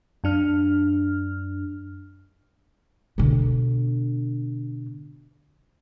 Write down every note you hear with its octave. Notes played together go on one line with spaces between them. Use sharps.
F#2 D4 F6
B2 D3